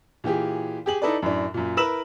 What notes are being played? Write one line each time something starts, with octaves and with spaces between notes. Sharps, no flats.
A#2 E3 G4 G#4
G4 G#4 F#7
D#4 E4 A4 B4 D5
F#2 A2 D4
F#2 A#2
E4 A#4 B4 E6 E7 F#7